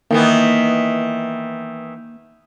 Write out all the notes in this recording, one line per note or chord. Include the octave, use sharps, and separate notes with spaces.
D#3 E3 A#3 B3